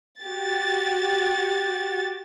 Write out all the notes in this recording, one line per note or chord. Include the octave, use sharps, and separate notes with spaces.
F#4 G4 A6